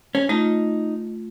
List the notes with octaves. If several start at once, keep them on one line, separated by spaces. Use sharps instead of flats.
C#4
A3 D#4 F4